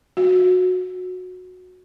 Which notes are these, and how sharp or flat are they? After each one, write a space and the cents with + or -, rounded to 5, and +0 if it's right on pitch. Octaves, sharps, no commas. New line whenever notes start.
F#4 -15